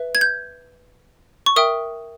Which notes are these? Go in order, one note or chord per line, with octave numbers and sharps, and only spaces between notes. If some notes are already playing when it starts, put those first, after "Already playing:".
Already playing: B4 E5
G#6
G6
C#6
A#4 E5 G5 D#6